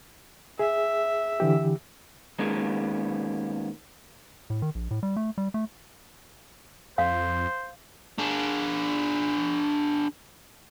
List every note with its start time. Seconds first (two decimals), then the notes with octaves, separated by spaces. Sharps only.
0.59 G#4 E5
1.40 D3 E3 G4
2.39 D#3 G#3 A#3 B3 C#4
4.50 A2
4.62 D#3
4.75 A#1
4.91 A2
5.03 G3
5.16 A3
5.38 G3
5.54 A3
6.98 F2 C5 F5
8.19 D4 G#4